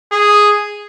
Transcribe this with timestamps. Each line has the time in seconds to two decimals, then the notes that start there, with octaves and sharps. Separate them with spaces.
0.12 G#4